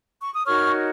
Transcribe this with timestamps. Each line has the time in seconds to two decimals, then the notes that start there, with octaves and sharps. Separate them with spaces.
0.21 C#6
0.33 D#6
0.45 D#4 F#4 A#4 C#5 C#6 F6